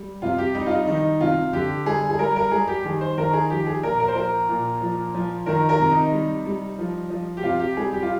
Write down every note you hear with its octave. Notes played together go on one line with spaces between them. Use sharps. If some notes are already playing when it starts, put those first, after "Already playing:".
Already playing: G3
C3 F4
G4
G3 D#4
F4
D#4
D#3 D#4
C3 F4
D3 G4
G3 G#4
G#4
G3 A#4
A#4
G3 G#4
G4
D#3 G#4
C5
D#3 A#4
G#4
F3 G4
G#4
A#2 A#4
A#4
C5
F3 A#4
A#2
F3
F3
D#3 A#4
A#4
C3
D#4
G3
G3
F3
F3
G4
C3 F4
G4
G3 G#4
G4
F4